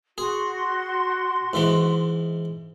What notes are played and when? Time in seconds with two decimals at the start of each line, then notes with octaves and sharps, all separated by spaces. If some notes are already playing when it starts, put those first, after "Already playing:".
0.18 F#4 G#4 C6
1.53 G#2 E3 G#3